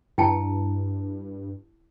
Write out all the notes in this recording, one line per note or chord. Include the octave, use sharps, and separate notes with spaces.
G2 E4 G5 A5